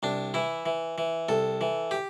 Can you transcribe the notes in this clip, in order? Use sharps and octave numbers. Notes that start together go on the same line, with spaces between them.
C2 D4
E3 E4
E3
E3
C2 A4
E3
G4